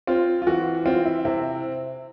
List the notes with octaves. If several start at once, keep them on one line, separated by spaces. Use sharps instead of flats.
C4 F4
F4
E3 F#4
C4 F4
E4
C3 E4